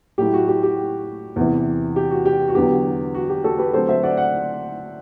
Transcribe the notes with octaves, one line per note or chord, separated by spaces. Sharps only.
A2 F#3 A3 E4 G4
F#4
G4
G4
E2 C3 E3
G4
F#4
G4
F#4
E2 D3 F#3 B3 G4
F#4
G4
F#4 A4
G4 B4
D3 F#3 A3 C4 A4 C5
C5 E5
D5 F#5
D5 F#5